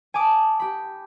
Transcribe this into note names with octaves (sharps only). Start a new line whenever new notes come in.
G#5 A5 D6 D#6
G4 B5